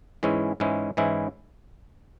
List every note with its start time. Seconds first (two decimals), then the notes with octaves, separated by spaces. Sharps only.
0.23 G#2 E3 G#3 C#4 E4
0.60 G#2 E3 G#3 C#4 E4
0.97 G#2 E3 G#3 C#4 E4